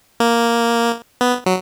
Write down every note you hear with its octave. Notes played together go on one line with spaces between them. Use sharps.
A#3
B3
F#3